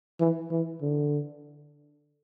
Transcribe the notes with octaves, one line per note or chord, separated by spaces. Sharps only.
E3
E3
D3